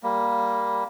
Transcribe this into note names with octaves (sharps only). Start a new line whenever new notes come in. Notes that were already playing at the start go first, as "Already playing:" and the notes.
G3 A#3